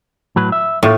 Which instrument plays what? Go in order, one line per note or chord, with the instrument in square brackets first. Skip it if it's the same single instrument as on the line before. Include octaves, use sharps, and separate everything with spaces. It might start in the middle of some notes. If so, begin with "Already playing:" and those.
[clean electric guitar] A2 F#3 B4
E5
[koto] A2 [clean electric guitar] A#3 F4 C#5